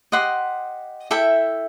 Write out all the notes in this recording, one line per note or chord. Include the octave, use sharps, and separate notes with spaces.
G4 D#5 F#5 C6
E4 A4 E5 G5